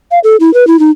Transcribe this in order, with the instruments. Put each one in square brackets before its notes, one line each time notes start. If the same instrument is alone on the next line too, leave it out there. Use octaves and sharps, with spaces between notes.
[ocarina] F5
A4
E4
B4
E4
D#4